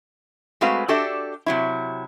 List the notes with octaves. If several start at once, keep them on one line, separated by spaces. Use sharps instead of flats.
G#3 A3 C4 F#4 B4 F5
D4 F#4 G4 A4 D5 E5
C3 F#3 E4